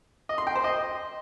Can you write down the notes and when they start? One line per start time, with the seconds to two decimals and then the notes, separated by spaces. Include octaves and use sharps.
0.29 D#5
0.38 C6
0.47 G5
0.55 C5
0.64 D#5